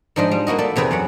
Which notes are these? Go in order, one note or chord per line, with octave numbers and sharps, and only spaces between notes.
G#2 F3 D4 C5 D#5
G3
A#3 E4 F#4 D#5
A4 D5 E5
E2 C3 G#4 B4 G5
F#2 C4 C#5 F#5